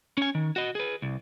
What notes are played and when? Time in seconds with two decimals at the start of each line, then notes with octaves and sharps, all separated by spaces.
0.17 C#4 G#5
0.35 D#3
0.56 F#4 D#5
0.75 G#4 B4
1.02 C2